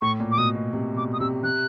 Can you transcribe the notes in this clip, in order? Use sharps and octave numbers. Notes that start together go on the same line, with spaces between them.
A2 C#6
A#2
D6
B2 D#6
B2
C3
B2 D6
D#6
C3 E6
C3 F#6